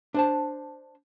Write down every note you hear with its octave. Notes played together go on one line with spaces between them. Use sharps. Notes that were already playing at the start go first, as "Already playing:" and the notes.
D4 C5 A5